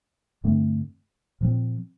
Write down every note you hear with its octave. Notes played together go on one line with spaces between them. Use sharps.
G2 D3 A3 C4
A#2 F3 C4